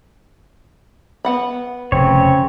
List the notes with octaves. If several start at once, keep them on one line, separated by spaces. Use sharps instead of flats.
B3 F#5 B5
F1 C#3 C4 C#5